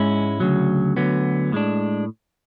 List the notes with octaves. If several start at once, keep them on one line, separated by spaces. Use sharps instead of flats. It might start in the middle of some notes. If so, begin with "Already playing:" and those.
Already playing: G#2 G#3 C#4 E4
D2 C#3 F#3
D2 D3 F#3 B3
A2 G#3 D4